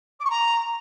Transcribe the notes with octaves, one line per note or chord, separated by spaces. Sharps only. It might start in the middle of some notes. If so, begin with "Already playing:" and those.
D6
C#6
A#5